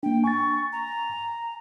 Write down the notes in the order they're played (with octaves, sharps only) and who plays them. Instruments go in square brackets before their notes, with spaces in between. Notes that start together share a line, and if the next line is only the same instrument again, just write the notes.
[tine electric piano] A#3 D4 [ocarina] G5
[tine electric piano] G#5 A6 [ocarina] C#6
[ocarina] A#5